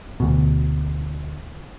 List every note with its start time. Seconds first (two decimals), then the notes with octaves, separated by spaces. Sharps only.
0.20 D2 B2